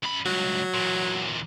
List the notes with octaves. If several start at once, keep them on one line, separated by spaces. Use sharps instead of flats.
F#2 B5
C#2 G2 F#3
E2 A#2